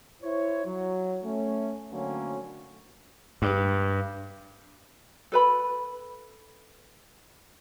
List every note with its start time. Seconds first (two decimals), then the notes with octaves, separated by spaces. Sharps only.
0.23 E4 C5 C#5
0.65 F#3
1.23 A3 C#4
1.91 D3 F#3 A3 A#3 C4 C#4
3.42 G2
5.32 A4 B4 B5